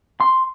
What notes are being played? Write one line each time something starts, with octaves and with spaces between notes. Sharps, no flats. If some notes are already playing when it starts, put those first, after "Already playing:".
C6